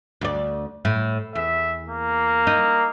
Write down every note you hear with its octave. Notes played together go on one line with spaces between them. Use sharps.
D2 D5
A2
E2 E5
A#3
D#4